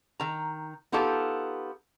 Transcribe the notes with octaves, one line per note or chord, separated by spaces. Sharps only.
D#3 A#5
B3 D#4 F4 G4 A4